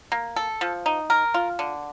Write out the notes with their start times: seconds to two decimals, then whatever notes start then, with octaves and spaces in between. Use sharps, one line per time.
0.12 A#3
0.36 A4
0.61 F3
0.86 D#4
1.10 A#4
1.34 F4
1.59 D3